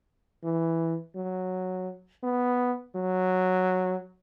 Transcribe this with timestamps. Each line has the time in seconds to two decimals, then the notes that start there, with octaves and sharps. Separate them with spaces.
0.44 E3
1.15 F#3
2.23 B3
2.96 F#3